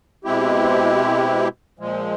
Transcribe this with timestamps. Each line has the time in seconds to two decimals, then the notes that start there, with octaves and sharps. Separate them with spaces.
0.24 B2 G#3 C4 E4 G4
1.79 A#2 F3 G#3